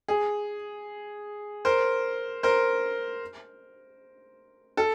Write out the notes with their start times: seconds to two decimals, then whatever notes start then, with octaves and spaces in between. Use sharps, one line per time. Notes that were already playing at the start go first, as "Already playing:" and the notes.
0.08 G#4
1.65 A#4 C5
2.43 A#4 C5
4.77 A4